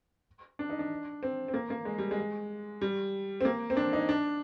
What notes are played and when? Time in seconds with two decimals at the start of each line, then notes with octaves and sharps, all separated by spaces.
0.59 D4
0.70 D#4
0.79 D4
1.23 C4
1.48 C4
1.54 A#3
1.70 A#3
1.85 G#3
1.98 G3
2.11 G#3
2.81 G3
3.41 C4
3.45 A#3
3.70 C4
3.77 D4
3.93 D#4
4.09 D4